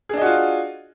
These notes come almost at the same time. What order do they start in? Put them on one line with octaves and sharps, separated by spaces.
G#4 D4 D#5 F#4 F4